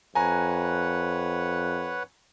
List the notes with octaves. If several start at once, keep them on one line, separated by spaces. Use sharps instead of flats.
F2 B4 C#5 F#5 G#5 A#5